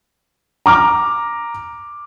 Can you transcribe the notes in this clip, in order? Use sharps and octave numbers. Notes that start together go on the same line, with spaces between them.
A#5 D6 F6